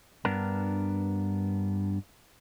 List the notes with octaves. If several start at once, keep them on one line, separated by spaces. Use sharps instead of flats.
G2 B3 D4 A#4